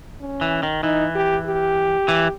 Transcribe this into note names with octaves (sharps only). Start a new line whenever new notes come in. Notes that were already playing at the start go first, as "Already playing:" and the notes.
C#4
E3
D#3
E3 D#4
G4
G4
E3